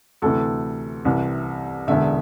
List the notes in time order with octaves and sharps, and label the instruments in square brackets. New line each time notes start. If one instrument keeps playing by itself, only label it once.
[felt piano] D2 C3 E3 A4
C2 C3 E3
E1 E2 D3 E5